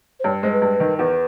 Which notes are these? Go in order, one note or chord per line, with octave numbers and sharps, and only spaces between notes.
C5
G2 C#5
G#3 C5
B4
G2
D#3
E2 B4